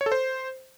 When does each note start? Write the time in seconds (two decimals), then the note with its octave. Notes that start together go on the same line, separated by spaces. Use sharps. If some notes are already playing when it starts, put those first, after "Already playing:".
0.01 C#5
0.06 A4
0.12 C5